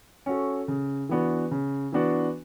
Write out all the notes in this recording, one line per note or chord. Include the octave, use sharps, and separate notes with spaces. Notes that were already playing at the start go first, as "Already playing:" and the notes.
C#4 F#4 A4
C#3
E3 B3 D4 F#4
C#3
E3 B3 D4 F#4